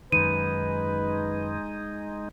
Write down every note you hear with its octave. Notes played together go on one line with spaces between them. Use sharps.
F#2 D#3 G#3 D#4 B4 D#7